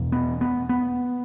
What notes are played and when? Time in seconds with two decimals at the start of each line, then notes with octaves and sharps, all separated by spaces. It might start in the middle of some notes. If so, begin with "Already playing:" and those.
Already playing: E2 B2
0.12 B3
0.41 B3
0.69 B3